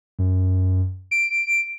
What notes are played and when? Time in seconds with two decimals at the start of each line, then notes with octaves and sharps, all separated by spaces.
0.19 F#2
1.11 D7